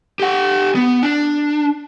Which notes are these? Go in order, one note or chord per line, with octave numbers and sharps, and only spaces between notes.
G4 F#5
B3
D4